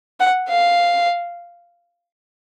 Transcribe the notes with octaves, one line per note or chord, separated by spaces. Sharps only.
F#5
F5